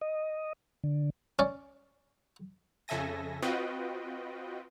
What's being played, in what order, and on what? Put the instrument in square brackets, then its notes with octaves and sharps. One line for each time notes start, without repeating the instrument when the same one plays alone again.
[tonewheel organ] D#5
D3
[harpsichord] C#4 D5
[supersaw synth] F2 C#3 A4 E5 G#5 A#6
C4 F4 F#4 B4 D#5 G5